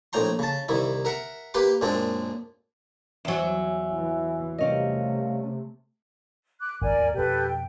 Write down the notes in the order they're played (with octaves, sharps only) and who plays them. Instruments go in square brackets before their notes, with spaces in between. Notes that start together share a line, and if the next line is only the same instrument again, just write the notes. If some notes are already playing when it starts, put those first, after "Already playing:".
[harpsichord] A#1 A2 G5 A#5 C6
C#3 A5
C2 D#3 E4
A#4 E5 F#5
A#3 G4 B4 C6 D6
F#2 A#2 G#3 C4 D4
[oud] E2 F#3 [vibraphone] E5 G#5 E6
[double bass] E3
[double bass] C3 A3 [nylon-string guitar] G3 C#4 D#5 [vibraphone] A#4 F5
[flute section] D6 F#6
[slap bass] G#1 F#2 [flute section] A#4 D5 G#5
[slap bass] D#2 G#2
[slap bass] F2 B2 [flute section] G4 A4 B4
[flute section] G5